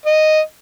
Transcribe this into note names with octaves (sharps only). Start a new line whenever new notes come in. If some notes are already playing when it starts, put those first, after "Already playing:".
D#5